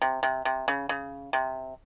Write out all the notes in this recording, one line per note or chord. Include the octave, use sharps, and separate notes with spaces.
C3
C3
C3
C#3
C#3
C3